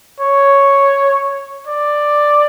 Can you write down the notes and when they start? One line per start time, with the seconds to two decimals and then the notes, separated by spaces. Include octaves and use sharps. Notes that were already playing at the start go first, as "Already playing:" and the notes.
0.20 C#5
1.67 D5